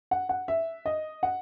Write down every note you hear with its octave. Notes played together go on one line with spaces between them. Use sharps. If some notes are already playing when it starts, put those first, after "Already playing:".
F#5
F#5
E5
D#5
F#5